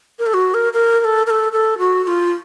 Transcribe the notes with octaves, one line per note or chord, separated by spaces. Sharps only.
A#4
A4
F#4
A#4
A#4
A#4
A4
A#4
A4
A4
F#4
F#4
F4